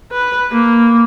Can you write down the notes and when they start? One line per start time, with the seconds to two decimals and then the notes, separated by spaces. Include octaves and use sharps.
0.12 B4
0.52 A#3